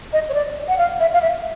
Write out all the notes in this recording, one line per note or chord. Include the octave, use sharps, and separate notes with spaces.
D#5
C#5
D5
F#5
F5
E5
F5
E5